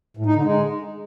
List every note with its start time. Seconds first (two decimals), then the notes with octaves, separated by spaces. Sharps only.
0.17 A2
0.26 D#4
0.35 D3
0.44 G#3